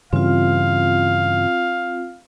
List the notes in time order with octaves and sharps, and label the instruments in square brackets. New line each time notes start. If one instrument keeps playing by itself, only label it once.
[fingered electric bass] G2 C#3 E3 [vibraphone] C4 F4 [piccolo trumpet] F5